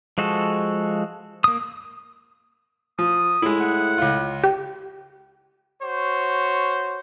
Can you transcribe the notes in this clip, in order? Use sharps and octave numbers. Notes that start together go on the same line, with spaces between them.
F3 G#3 F#4 A4
A#3 D#6
F3 D#6
A2 G#3 E4
F#5
C#2 F4
G4
F#4 C5 C#5